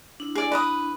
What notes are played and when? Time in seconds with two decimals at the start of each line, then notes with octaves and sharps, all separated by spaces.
0.20 D4 E4
0.35 G#4 D5
0.52 B4 A#5 D#6